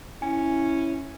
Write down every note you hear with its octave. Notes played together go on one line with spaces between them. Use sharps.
C#4 E4 G#5